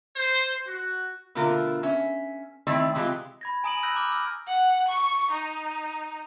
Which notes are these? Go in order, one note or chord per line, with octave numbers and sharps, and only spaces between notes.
C5
F#4
B2 D3 A3 F4 A#4
C#4 E5
D#3 A3 C4 E4 D5
C3 E3 G#3 F4 G4
B5 G#6 A#6
G#5 A#5 D#6 D7 D#7 F#7
B5 E6 F#6 G6 A#6
A#5 D6 F6
E6 F6
F#5
C#6
D#4